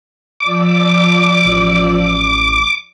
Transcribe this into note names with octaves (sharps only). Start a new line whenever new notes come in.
F3 D5 D6 E6
A1